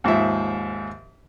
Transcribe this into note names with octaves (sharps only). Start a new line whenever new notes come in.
D#2 G#2 F3 E5